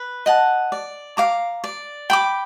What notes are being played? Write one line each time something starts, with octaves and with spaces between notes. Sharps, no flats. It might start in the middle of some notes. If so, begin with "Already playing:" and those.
Already playing: B4
D#5 F#5 A5
D5
F5 A#5 D6
D5
G5 B5 D6